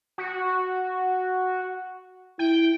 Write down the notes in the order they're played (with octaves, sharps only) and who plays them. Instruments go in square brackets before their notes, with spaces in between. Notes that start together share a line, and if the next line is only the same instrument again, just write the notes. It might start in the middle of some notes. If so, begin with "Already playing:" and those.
[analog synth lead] F#4
[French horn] E4 [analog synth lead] G5